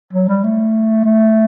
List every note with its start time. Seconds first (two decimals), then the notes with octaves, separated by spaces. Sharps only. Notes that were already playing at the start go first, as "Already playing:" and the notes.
0.13 F#3
0.28 G3
0.44 A3
1.04 A3